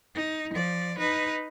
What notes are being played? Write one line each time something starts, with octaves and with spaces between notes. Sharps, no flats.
D#4
F3 D5
D#4 B4